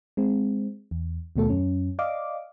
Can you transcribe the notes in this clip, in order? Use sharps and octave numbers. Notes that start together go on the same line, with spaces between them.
G#3 C4
E2
D#2 B2 A3 A4
F#2 C#4
D5 D#5 F5 D6